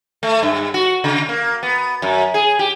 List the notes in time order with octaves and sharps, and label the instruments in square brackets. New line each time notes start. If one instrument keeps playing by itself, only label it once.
[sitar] A3
G2
F#4
C#3
A#3
B3
F#2
G#4
G4